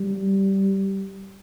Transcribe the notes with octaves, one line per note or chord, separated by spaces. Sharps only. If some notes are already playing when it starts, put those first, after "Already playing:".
Already playing: G3